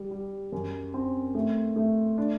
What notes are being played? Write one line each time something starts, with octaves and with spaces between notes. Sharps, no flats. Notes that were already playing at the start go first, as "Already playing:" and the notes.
Already playing: G3
G3
F#2
C4
A3
A3
D4